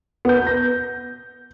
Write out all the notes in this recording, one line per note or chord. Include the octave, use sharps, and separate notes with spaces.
B3 G6
A#6